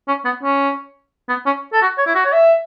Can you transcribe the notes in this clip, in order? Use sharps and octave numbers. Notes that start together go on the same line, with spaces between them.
C#4
B3
C#4
B3
C#4
A4
F#4
C#5
E4
F#4
C#5
E5